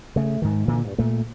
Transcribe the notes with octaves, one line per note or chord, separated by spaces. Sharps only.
C#3 A3
G#2 D#3
A#2 D3 E3
G2
A#2 A3